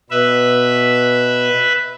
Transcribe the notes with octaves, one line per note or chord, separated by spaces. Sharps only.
B2 B4 E5